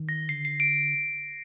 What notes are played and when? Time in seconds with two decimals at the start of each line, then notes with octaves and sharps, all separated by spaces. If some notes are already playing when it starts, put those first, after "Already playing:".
Already playing: D#3
0.09 A#6
0.29 D3 C7
0.45 C7
0.60 D7